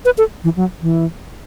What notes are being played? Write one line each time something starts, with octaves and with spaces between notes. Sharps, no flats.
B4
A4
E3
F#3
E3